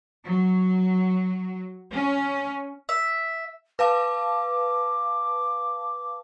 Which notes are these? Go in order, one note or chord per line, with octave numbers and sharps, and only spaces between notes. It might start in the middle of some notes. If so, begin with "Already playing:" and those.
F#3
C#4
E5
B4 F5 A5 D6